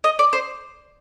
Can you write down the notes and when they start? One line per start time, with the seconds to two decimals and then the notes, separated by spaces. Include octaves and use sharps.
0.04 D#5
0.19 D5
0.33 C5